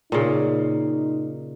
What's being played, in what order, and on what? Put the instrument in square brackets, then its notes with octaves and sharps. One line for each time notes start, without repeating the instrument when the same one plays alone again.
[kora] A#2 C#3 [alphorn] D#4